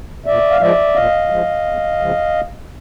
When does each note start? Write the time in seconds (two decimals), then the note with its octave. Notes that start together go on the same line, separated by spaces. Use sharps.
0.26 A#2 D5 E5
0.51 F5
0.60 F3 G#3 D5 E5
0.95 A#2 D#5 F5
1.30 F3 G#3
1.65 E2
2.00 C#3 F3 G#3